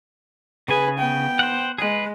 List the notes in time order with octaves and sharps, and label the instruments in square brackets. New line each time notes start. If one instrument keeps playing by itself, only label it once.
[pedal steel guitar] C#3 G#5 [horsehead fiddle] G#4 B4
[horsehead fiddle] B3 G5
[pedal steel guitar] C5 F#5
[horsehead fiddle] G#3 [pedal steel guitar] G#4 B4